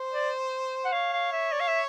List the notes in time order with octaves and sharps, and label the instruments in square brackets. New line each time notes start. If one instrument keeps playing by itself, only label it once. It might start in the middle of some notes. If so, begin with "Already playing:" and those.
Already playing: [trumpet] C5
[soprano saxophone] D5
F#5
[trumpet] C#5 [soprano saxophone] F5
[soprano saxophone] F5
E5
D5
F5
E5